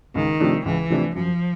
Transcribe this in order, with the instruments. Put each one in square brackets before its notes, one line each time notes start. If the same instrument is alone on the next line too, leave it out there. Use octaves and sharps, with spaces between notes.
[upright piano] C#2 [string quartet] D#3
[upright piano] C3 F3 A3 D4
[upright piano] C#2 [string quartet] E3
[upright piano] C3 F3 A3 D4
[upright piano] F#2 [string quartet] F3